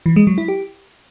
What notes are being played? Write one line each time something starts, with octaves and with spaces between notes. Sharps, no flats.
E3
G#3
F#3
E4
G4